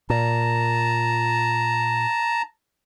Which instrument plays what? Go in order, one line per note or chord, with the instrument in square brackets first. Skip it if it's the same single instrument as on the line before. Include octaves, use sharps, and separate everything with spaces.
[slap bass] A#2 [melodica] A5 A#5